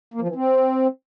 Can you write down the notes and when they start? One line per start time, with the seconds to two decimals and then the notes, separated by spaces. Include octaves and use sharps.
0.14 A#3
0.21 F3
0.28 E3
0.36 C4